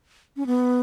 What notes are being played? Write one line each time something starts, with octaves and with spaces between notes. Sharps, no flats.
C#4
B3